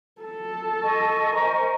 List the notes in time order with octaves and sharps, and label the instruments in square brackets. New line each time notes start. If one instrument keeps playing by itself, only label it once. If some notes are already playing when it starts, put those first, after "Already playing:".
[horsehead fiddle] A4 A5
[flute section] D#5 G#5 C#6
[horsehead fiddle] A#4 C5